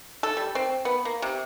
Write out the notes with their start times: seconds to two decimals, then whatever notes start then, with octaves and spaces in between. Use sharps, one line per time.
0.23 A4
0.37 G3
0.55 C4
0.85 B3
1.05 A#3
1.22 C3